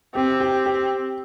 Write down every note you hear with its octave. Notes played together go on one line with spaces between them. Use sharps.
C4 G4
G4
G4